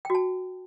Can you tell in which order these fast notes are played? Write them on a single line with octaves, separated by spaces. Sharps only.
G5 F#4 A5